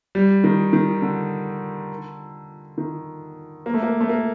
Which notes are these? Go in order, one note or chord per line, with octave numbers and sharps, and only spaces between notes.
G3
D#3
D#3
D3
D#3
A#3
A3
A#3
A3
A#3